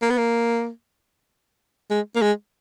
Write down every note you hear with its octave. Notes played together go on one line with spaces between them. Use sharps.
A#3
B3
A#3
G#3
A#3
G#3